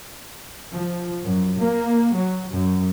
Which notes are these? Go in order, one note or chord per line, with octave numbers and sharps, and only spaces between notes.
F3
F#2
A#3
F#3
F#2